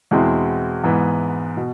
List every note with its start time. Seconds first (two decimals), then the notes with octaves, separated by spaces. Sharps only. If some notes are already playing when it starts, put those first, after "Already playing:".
0.11 E2 B2 G#3 C4 E4
0.84 G#2 E3 B3
1.57 B2